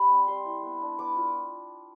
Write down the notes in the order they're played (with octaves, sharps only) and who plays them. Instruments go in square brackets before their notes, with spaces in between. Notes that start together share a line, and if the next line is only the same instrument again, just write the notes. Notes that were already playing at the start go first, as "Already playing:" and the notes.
Already playing: [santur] G3 B5
C4
G3 C6
E4
B3
D4
B3 D6
F4